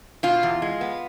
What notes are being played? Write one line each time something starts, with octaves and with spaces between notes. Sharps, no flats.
B2 F4
E2
G#3
B3